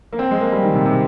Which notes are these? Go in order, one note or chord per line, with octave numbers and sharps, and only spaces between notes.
A#3
C4
G#3
A#3
G3
D#3
C3
C3